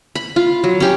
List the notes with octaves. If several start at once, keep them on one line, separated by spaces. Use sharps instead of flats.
B5
F4
F#3
C#4 G4